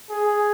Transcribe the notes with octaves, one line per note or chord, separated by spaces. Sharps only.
G#4